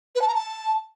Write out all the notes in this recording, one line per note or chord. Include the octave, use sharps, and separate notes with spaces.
B4
A5
A#5
A5